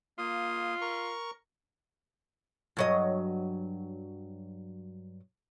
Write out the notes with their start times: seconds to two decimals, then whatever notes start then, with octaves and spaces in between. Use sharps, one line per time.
0.18 A#3 F4 D#6
0.81 A#4 C#6
2.77 G2 F#3 D#5